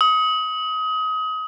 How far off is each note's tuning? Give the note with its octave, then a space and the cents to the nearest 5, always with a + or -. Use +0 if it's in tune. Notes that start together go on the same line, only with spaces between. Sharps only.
D#6 +25